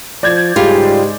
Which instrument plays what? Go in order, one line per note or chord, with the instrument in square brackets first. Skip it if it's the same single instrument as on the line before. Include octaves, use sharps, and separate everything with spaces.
[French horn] F3 [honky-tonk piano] D5 G6 G#6
[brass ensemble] G#2 C#3 G#3 [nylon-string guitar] G3 F4 [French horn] G4